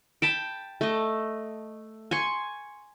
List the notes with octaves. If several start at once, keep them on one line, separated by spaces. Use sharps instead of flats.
G5 A5 B5
A3 D#5
G#5 C6 C#6